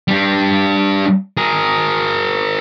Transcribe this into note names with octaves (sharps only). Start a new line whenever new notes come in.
G3 D4
G#4 A#4